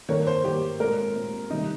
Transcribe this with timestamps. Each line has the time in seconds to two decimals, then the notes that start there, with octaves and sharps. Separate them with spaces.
0.09 D#3 A#3 C#5
0.27 C5
0.44 D#3 A#3 G4
0.80 A#2 G#3 C4 A#4
1.14 A#2 G#3 C4
1.50 C3 D#3 G3 D#4